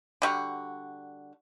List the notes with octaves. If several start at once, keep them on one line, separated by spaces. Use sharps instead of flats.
D3 G3 F#4